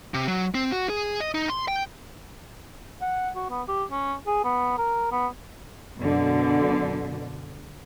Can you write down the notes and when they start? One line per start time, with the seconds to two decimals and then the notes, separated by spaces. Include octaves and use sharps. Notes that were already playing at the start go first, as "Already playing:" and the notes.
0.14 C3
0.28 F#3
0.55 C4
0.72 F#4
0.90 G#4
1.20 D#5
1.34 D#4
1.49 C6
1.68 G5
3.01 F#5
3.35 F#4
3.50 B3
3.68 G4
3.91 C#4
4.27 G#4
4.44 B3
4.78 A#4
5.12 B3
5.98 F#2 B2 D3